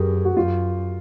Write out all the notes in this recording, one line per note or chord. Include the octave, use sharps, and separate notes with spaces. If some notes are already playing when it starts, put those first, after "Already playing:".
Already playing: F#2 G4 G#4 A#4 B4
F#4
F#2 F4